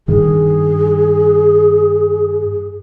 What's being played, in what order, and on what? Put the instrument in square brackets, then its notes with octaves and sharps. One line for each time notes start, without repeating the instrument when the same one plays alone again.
[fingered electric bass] G2 D#3 [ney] G#4